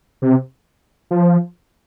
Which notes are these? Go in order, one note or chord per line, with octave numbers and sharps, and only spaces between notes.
C3
F3